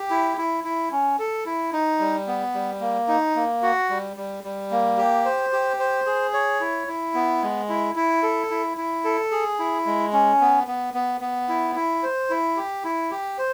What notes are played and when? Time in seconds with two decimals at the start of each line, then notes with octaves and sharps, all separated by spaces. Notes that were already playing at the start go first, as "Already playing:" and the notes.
Already playing: G4
0.10 E4
0.37 E4
0.64 E4
0.91 C#4
1.19 A4
1.46 E4
1.73 D#4
1.99 G3
2.27 B3
2.54 G3
2.81 A#3
3.08 D#4
3.36 A#3
3.62 F#4
3.89 G3
4.17 G3
4.44 G3
4.71 A#3
4.98 G4
5.25 C5
5.53 G4
5.79 C5
6.06 G#4
6.33 C#5
6.60 E4
6.87 E4
7.14 B3
7.43 G#3
7.69 E4
7.96 E4
8.23 A4
8.50 E4
8.77 E4
9.05 A4
9.32 G#4
9.59 E4
9.86 G#3
10.13 C#4
10.40 B3
10.67 B3
10.94 B3
11.21 B3
11.49 E4
11.75 E4
12.03 C5
12.30 E4
12.57 G4
12.84 E4
13.11 G4
13.38 C5